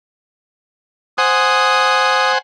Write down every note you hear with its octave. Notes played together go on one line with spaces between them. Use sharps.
C5 F#5 G#5 D#6